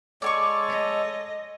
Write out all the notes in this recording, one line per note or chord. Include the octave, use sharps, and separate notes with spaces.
G#3 A4 C#5 D5 G#5 C#6
D#5